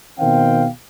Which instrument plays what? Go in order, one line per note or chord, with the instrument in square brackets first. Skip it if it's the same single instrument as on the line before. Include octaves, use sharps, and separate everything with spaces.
[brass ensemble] B2 D#3 C4 F5 G5